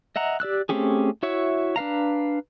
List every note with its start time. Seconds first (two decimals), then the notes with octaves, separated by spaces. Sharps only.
0.16 D#5 E5 F#5 A#5
0.40 G4 D5 E6 F#6
0.69 A3 C4 C#4 G4 G#4
1.23 E4 F#4 C#5 E5
1.76 D4 B4 F5 A#5